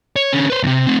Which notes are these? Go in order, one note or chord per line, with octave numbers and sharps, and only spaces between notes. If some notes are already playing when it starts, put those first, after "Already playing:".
C#5
D3 C#4
B4 C5
E2 C3
A3 C4